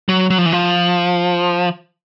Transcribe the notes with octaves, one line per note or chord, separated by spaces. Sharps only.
F#3
F#3
F3
E3
F3